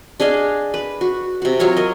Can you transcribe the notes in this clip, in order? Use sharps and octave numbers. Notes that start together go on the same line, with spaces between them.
D4 G#4 D#5 F5
B4
F#4
C3 F#4
F#3 F4 C#5 A#5
A#4 D#5